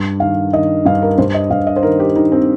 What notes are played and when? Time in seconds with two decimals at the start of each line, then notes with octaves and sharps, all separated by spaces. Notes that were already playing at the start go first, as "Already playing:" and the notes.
Already playing: G2
0.20 D#3 F5
0.53 D#3 D#5
0.85 G2 F5
1.02 A#4
1.18 G2 C5
1.34 D#5
1.50 G2 F5
1.67 D#5
1.76 C5
1.83 D#3 A#4
2.00 G4
2.15 D#3 D#4
2.32 C4